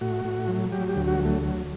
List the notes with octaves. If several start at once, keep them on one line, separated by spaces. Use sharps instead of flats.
A2 F#4
A2
F#3
F#3 G4
G4
D2
F#4
F#3
A3
F#3